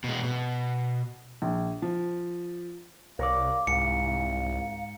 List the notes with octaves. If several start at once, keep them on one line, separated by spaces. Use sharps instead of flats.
B2 G#3
B2
A#1
F3
C2 A#4 C#5 D5 F5
C2 G#2 C#7